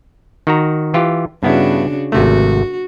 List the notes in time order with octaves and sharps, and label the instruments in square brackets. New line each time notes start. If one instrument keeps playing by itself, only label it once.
[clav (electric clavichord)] D#3 F#4 A#5
E3 F4 G4
[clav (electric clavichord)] G2 B3 E4 [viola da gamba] C#3 D4 F#4
[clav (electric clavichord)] G#1 C3 A3 [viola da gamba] F#4